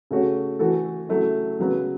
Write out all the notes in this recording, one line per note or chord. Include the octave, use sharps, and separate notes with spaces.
C#3 A3 F#4 C#5
E3 A3 F#4 A4
C#3 F#3 A3 E4
C#3 F#3 B3